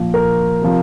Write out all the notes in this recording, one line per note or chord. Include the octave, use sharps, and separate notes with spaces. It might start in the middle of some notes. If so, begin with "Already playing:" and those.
Already playing: A#2 F3
A#4
C3 F3